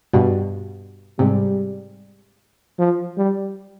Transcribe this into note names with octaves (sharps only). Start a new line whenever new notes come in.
G2 B2
G#2 C3 G3
F3
G3